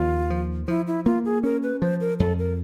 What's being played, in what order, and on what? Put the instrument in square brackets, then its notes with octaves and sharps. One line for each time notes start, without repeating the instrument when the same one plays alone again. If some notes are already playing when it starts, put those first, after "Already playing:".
Already playing: [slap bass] D#2 F3 [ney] F4
[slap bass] F3
[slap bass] F3 [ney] E4
[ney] E4
[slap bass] A#3 [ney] F4
[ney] G#4
[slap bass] C#4 [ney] A#4
[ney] B4
[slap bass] F3 [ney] C5
[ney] A#4
[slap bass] F2 [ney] A4
[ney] A#4